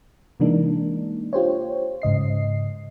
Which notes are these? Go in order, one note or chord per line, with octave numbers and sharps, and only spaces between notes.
C3 E3 G#3 A#3 D4 D#4
F4 G4 C5 C#5
G#2 C#3 D#5 C7